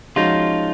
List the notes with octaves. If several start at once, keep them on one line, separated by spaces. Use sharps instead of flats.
F3 G#3 C#4 D#4 F4 F#4